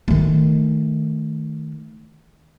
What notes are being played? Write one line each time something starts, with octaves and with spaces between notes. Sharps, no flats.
D#3 A3